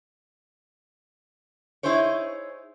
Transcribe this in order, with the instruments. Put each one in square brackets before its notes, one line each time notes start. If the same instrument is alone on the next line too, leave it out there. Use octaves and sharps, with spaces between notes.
[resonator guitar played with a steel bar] D#4 E4 G#4 C5 C#5